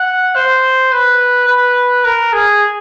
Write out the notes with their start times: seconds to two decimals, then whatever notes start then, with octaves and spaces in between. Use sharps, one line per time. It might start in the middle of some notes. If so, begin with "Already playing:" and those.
Already playing: F#5
0.36 C5
0.92 B4
1.48 B4
2.05 A#4
2.33 G#4